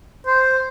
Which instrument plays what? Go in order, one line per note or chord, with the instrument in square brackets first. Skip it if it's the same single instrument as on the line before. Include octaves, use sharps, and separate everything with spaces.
[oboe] C5